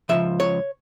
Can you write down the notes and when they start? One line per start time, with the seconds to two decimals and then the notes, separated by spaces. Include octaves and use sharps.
0.09 C#2 C3 F3 E5
0.40 C#5